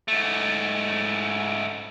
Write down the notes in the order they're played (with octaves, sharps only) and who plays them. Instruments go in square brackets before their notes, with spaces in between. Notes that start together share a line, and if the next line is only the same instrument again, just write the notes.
[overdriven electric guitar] G#2 A3